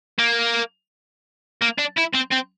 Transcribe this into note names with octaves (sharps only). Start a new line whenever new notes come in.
A#3
A#3
D4
E4
C4
C4